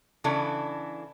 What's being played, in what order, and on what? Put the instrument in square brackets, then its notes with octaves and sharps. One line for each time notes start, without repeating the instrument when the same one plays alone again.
[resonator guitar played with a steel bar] C#3 E3 D4 E4 A4